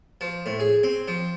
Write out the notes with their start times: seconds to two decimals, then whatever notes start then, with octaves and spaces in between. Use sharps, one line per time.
0.21 F3
0.46 A2
0.60 G#4
0.83 C4
1.08 F3